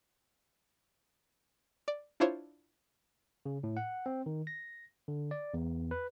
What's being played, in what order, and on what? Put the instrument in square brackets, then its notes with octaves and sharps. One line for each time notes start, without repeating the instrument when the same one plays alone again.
[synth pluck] D5
D4 E4 F4 C5 C#5
[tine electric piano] C#3
A2
F#5
C4
D#3
A#6
D3
D5
E2
B4